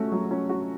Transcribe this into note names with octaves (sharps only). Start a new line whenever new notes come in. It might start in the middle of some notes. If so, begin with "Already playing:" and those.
Already playing: A3 C#4 F#4
F#3
C#4
F#4